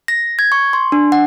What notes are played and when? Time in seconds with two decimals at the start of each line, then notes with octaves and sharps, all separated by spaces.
0.08 A#6
0.39 G#6
0.52 C#6
0.73 C6
0.92 D4
1.12 F#5